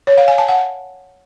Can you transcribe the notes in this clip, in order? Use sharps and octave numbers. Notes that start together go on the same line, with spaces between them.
C#5
F5
G#5
A5
F#5